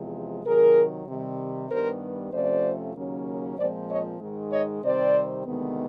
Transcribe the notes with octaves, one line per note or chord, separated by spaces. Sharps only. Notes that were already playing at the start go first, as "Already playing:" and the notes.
Already playing: E2 C3 F3 G#3
C3 D#3 F#3 G#4 A#4
C3 D#3 G3
G2 D#3 G3 B3 A#4 C5
F2 C3 F3 A3 C#4 C5 D5
D#2 C#3 F#3 A#3 C#4
A#2 F3 G#3 C4 C5 D5
C#5 D#5
G#2 D#3 G#3
C#5 D#5
C3 D#3 G3 C4 C5 D5
D2 C3 D#3 G#3 B3